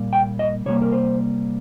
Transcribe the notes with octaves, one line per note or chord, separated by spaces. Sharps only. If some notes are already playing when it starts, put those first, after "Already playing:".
Already playing: A#2 G3 A#3
G5
D#5
C3 G3 A#3 C#5
A#4
C5